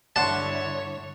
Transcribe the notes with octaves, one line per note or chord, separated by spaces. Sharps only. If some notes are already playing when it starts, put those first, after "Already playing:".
G2 D3 E4 C#5 D5 F#5 A5 C6